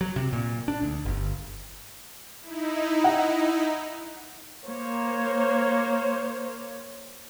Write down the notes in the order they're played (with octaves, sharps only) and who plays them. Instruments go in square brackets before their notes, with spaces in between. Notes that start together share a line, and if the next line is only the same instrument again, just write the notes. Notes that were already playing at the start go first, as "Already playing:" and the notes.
[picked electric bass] F#3
C3
A#2
D4
D2
G1
[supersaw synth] D#4 E4
[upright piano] F#5
[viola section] A#3 C5 C#5